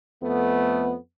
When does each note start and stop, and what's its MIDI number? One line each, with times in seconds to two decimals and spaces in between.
0.21 0.95 41
0.21 0.95 57
0.21 0.95 59